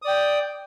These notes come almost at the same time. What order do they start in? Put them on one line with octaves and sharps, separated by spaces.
D#6 D5 G5